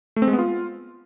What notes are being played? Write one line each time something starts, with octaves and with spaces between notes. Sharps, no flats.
A3
C4
G#3
B3
F4